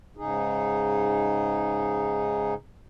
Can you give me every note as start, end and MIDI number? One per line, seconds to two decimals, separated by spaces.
0.17 2.54 44
0.17 2.54 49
0.17 2.54 63
0.17 2.54 68